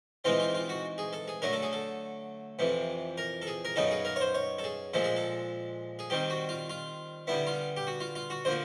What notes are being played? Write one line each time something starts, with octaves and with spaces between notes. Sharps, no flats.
G#2 E3 G#3 C4 D#4 F4
F4
F4
F#4
G#4
A4
G#4
D3 F#3 A3 A#4
A4
G#4
A4
F2 C3 E3
A#4
A4
G#4
A#4
F#2 C#3 F#3 B3 D#4 A4
G#4
A#4
C#5
C5
C#5
A4
G#4
A#2 F3 G#3 A4
G#4
A4
G#4
D#3 G3 C4 G4
F#4
F4
F4
D3 G3 B3 E4
F4
G4
F#4
F4
F4
F#4
D3 F3 A#3 C5